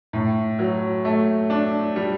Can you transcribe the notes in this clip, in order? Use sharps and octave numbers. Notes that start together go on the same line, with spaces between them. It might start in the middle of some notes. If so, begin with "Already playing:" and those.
A2
F#3
A3
D4
G3